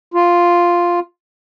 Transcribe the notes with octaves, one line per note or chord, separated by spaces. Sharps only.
F4